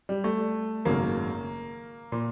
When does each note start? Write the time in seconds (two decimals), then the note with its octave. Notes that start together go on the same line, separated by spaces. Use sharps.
0.09 G3
0.24 A3
0.85 G#1 F#2 C#3 A#3
2.12 A#2